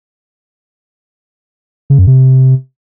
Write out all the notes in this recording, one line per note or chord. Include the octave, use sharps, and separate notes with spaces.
C#3
F#2
C3